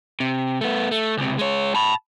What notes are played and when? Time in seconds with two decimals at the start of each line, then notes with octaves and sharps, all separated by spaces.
0.20 C3
0.61 A3 B3
0.91 A3
1.17 C#2 C3
1.39 G#3 C#5
1.75 A5 B5